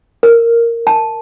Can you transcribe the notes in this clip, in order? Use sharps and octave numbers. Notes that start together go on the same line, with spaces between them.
A#4
A5